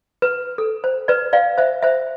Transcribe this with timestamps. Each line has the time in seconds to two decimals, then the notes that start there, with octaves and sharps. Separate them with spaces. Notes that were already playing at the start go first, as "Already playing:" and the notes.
0.22 B4
0.58 A4
0.84 C5
1.08 B4 D5
1.33 D5 F5
1.58 C5 E5
1.83 C5 E5